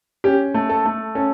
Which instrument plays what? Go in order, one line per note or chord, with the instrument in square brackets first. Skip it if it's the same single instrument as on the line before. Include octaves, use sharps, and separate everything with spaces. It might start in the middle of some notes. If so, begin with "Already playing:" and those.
[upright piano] C#4 G4
A3
A4
A3
C#4 A4